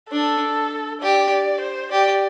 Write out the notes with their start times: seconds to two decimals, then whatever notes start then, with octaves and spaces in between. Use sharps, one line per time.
0.12 D4 A4
1.02 G4 D5
1.32 D5
1.61 C5
1.92 G4 D5